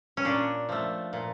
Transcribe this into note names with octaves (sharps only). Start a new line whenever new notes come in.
C#4
A#2 D4
F3 A3
A#2